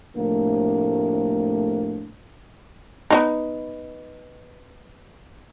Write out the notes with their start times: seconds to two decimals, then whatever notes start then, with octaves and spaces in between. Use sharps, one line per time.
0.16 A2 C3 F3 A3 A#3 D4
3.10 B3 D4 D#4